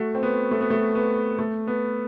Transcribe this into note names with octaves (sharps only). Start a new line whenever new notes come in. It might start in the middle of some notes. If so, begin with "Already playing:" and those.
Already playing: A3 F#4
C4
B3
A3
B3
A3
B3
A3
B3